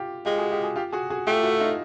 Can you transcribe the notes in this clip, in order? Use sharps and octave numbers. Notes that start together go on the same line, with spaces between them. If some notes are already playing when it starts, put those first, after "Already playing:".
Already playing: F4 G4
G#3 F4 G4
F#4 G#4
F4 G4
F#4 G#4
F4 G4
F#4 G#4
F#4 G#4
A3 F4 G4
E4 F#4
D#4 F4